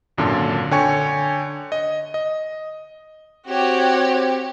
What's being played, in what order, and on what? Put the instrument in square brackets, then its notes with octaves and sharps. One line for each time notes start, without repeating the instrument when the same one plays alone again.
[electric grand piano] G#1 F#2 A#2 D3 F4 A5
D3 C#5 G5 G#5 C#6 C#7
D#5
D#5
[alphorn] C4 [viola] F#4 C#5 [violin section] G4